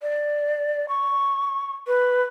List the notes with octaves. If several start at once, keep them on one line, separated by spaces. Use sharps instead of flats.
D5
C#6
B4